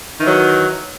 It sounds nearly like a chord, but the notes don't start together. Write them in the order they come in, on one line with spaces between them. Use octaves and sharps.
D#3 E3 F#3